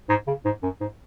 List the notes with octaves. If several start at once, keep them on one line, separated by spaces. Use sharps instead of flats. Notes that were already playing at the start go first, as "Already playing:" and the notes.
G#2
C#3
G#2
F#2
G#2